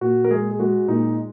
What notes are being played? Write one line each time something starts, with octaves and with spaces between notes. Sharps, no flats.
A#2 F#4
A#4
G#3 G#4
G#4
G#3 F#4
A#2 D#4